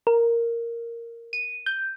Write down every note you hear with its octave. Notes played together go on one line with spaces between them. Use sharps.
A#4
D#7
G6